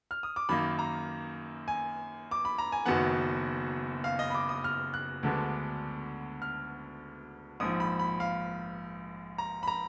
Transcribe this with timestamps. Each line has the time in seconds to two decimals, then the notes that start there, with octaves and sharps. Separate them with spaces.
0.11 F6
0.23 D#6
0.36 D6
0.49 F#2 D#3 A#3 D#4 B5
0.79 A#5
1.68 G#5
2.31 D6
2.45 B5
2.58 A#5
2.72 G#5
2.86 F#1 F#2 D#3 F#3 B3 F#5
4.04 F5
4.19 D#5
4.30 B5
4.34 D6
4.49 D#6
4.64 F6
4.94 F#6
5.23 D2 D3 G#3 B3 D4
6.42 F6
7.60 A#1 G#2 F3 D#6
7.80 B5
7.99 B5
8.20 F5
9.38 A#5
9.63 B5
9.68 A#5